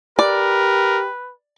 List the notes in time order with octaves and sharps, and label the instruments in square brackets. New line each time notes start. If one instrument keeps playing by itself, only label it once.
[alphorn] G4 [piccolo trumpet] A#4 [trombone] B4 [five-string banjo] D5